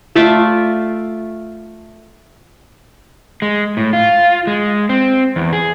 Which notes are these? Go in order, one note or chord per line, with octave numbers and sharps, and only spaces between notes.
A3 F4 D5 E5
G#3
A2
F4
G#3
C4
E2
G#4